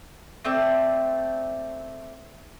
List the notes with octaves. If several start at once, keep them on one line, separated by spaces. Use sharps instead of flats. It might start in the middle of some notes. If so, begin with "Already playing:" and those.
A3 C4 D5